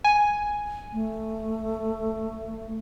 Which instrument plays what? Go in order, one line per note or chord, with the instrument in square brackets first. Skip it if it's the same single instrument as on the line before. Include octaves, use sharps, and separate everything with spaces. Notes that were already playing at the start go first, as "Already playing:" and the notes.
[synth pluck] G#5
[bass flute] A3